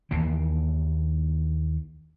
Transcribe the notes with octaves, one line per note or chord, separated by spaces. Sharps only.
D#2 E3 A#3